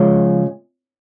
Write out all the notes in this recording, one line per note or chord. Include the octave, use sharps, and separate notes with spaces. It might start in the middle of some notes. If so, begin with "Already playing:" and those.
Already playing: C#3 F3 G#3